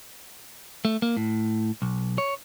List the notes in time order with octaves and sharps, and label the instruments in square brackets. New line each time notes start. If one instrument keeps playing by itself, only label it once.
[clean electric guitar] A3
A#3
A2
B1
C#5